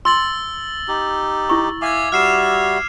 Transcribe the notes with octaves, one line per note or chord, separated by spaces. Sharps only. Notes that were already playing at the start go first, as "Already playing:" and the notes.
C6 E6 A6 F#7
D#4 G4
E4 C#6
E5 F5 G#5 D6 G#6
G3 F#4 E5 F6 C7 E7